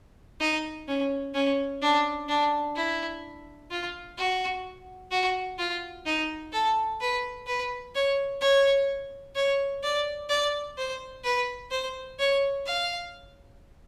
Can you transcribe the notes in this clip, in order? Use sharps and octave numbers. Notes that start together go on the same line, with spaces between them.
D#4
C#4
C#4
D4
D4
E4
F4
F#4
F#4
F4
D#4
A4
B4
B4
C#5
C#5
C#5
D5
D5
C5
B4
C5
C#5
F5